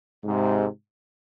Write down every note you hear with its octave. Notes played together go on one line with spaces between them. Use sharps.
G#2 C3